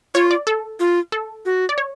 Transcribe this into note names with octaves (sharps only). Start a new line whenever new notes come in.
F4 C#5
D5
A4
F4
A4
F#4
D5
C#5